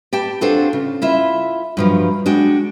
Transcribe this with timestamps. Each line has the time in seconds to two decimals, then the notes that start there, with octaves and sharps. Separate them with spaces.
0.13 G4 D5 G5 A5
0.41 C4 D4 F4 F#4 A4 C5
0.73 C#3
1.02 E4 F4 E5
1.77 G2 F3 F#3
2.26 G#3 D4 F#4 G5